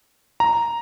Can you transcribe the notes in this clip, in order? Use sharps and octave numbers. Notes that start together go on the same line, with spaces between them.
A#5